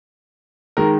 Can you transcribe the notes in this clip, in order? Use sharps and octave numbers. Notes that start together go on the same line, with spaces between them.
D#3 G#3 A#4